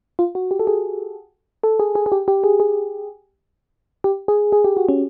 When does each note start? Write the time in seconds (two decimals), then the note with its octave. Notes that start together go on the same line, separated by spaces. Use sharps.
0.19 F4
0.35 F#4
0.51 G4
0.59 A4
0.67 G#4
1.63 A4
1.80 G#4
1.95 G#4
2.06 G#4
2.12 G4
2.28 G4
2.44 G#4
2.60 G#4
4.04 G4
4.28 G#4
4.52 G#4
4.64 G4
4.77 F#4
4.89 C#4